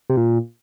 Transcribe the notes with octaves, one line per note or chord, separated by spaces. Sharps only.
C3
A#2